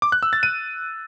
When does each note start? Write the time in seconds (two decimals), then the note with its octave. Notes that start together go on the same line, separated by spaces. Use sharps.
0.02 D6
0.12 F#6
0.23 E6
0.33 A6
0.43 D#7